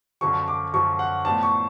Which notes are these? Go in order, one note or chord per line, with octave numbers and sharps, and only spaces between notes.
F#2 D3 F3 C#6
D6
F#2 D3 F3 C#6
F#5
A2 F3 B3 D4 A5
C#6